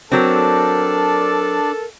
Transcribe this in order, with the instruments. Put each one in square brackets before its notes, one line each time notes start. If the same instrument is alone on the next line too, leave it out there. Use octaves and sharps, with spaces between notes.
[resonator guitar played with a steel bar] F#3 C4 [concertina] D4 D5 [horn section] A4 [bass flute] A#4